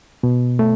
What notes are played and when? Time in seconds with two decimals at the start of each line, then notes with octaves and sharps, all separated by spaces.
0.23 B2
0.59 A3